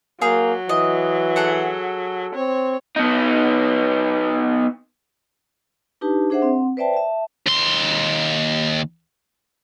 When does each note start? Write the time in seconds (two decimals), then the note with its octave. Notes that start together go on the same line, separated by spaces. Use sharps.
0.22 F#3 A#3 G#4 F5 G5
0.69 E3 D#5
1.36 G#4 A4 F#5
2.35 C4 C#5
2.96 B3 D#4
6.01 D4 D#4 G4 B4 A5
6.30 D4 G#4 C5 E5 F#5
6.42 C4 F#5
6.77 B4 C5 D5 E5 G5 A5
6.94 E5 A5
7.46 D#2 C6